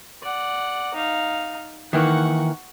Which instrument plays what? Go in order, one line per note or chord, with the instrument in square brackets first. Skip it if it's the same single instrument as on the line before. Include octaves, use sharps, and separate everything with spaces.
[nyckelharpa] D5 F#5
D#4 F5
[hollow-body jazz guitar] D#3 E3 A#3 [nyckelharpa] F#5 C#6